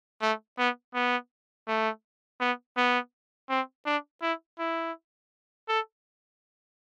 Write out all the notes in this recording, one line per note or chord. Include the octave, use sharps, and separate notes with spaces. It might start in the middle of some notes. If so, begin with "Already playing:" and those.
A3
B3
B3
A3
B3
B3
C4
D4
E4
E4
A4